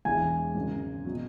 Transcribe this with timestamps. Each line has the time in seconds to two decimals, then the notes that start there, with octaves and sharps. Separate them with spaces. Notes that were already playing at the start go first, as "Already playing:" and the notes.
0.05 E1 E2 E3 G#3 E4 G#5
0.55 G#1 F#2 C#3
1.05 B2 F#3